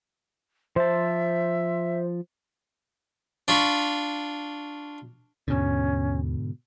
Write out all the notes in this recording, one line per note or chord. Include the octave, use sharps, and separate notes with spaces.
F3 C5 E5 A5
D4 F4 B5 C#6
D#2 G#2 B2 D3 C#4